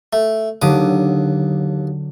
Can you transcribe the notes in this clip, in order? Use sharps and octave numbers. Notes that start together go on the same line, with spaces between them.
A3
D#2 D3 F#3 D6 D#6